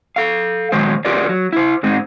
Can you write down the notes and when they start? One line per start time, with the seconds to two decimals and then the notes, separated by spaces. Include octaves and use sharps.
0.16 A4 F5
0.72 A#2 D#3 F#3 G#3 C5
1.05 F4 G4 G#4 A#4 B4 D5
1.29 F#3
1.53 E4 C5
1.83 G#2 G#3 C4 D#4